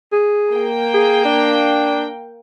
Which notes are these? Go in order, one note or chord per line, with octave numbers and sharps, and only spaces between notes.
G#4
A#3 G5
G#4
D4